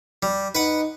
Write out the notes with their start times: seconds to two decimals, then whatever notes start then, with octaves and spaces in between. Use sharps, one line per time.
0.23 G3
0.55 D#4 B4 F#5